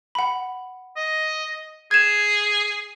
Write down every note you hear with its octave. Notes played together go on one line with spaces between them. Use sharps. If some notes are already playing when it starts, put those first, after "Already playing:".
F#5 B5
D#5
G#4 G#6 E7